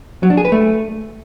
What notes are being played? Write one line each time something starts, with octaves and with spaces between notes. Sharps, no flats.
F#3
D4
G#4
B4
A3